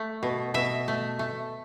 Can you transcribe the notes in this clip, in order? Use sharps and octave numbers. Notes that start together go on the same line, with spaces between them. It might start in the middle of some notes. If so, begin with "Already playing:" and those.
Already playing: A3
B2
B2 E5
A3
A3